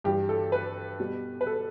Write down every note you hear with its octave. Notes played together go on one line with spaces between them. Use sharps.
G2 E3 G3 G4
A4
B4
B2 G3
B4
A4